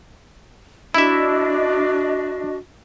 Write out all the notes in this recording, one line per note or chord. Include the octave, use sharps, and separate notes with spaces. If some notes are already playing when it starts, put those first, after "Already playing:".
D4 E4 F#4 D#5 E5